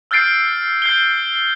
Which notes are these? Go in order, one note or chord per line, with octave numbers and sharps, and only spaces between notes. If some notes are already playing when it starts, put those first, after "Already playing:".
E6 F6 G6 A6 C7 D7
G6 C7 G7